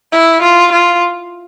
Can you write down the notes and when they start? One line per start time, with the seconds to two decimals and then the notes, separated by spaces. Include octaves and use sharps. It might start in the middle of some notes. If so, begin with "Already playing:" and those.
0.12 E4
0.42 F4
0.72 F4